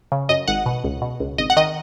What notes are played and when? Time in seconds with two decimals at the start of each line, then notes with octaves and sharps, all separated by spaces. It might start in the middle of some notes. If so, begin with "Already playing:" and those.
0.12 C#3
0.29 F#2 D#5
0.48 G#1 F#5
0.66 B2
0.84 C#2
1.02 B2
1.20 C#2
1.38 G#1 D#5
1.50 F#5
1.57 D#3 D#5